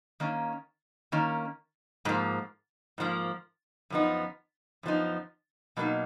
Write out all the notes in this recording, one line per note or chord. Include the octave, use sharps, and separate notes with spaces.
D#3 A#3 C#4
D#3 A#3 C#4
G#2 F3 A#3
G#2 F3 A#3
F#2 F3 B3 D#4
F#2 F3 B3 D#4
B2 F#3 A#3 D#4